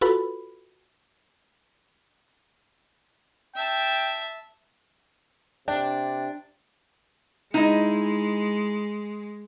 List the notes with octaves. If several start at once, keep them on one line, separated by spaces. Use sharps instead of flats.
F4 F#4 A4 B4 B5
E5 G5 A5
C3 D4 D5 G5
G#3 D#4 E4 D#5